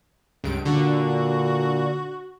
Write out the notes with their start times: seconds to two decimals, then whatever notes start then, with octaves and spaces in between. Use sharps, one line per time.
0.44 C#2 G2 D7
0.65 A#2 D3 F#4